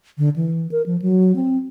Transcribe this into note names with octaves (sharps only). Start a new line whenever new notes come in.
D3
E3
A#4
F3
F#3
C4